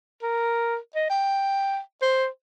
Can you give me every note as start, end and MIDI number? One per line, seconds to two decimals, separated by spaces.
0.23 0.77 70
0.95 1.07 75
1.10 1.80 79
2.02 2.27 72